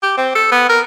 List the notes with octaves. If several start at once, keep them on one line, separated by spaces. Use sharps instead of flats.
G4
C4
A4
B3
A#4